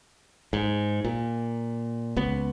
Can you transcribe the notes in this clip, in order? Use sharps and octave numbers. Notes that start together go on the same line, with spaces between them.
G#2
A#2
C#2 B3